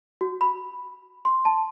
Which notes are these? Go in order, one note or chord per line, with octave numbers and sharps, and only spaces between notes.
F#4
B5
C6
A5